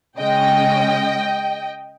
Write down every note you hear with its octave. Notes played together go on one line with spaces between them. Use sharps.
C#3 G#3 C#4 D#5 G5